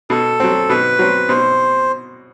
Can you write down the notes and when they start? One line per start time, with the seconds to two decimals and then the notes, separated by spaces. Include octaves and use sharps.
0.10 B2 A4
0.40 F#3 C4
0.69 B2 B4
0.99 F#3 C4
1.29 B2 C5